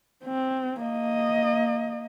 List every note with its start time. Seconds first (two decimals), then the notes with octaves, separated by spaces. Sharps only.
0.25 C4
0.81 A#3 D#5